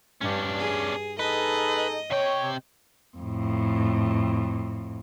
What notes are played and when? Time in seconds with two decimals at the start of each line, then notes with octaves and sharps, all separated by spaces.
0.21 G2 C#4 D4
0.59 G#4
1.19 D#4 G#4 A4 B4 D#5
2.11 C3 C#5 G5
3.17 F2 A2